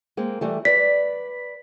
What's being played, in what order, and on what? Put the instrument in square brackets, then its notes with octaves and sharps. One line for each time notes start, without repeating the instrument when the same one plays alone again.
[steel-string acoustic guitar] G#3 A#3 C4
E3 G3 A3
[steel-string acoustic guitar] B4 D5 [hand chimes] B6